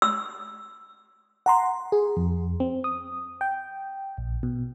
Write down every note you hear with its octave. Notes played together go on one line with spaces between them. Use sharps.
E6
F#5 A#5 C6
G#4
F2
C4
D#6
G5
A#1
B2